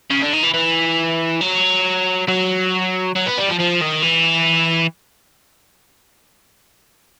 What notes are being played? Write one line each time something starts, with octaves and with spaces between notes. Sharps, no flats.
C#3
D3
D#3
E3
E3
F#3
F#3
F#3
B3
G3
F3
F3
D#3
E3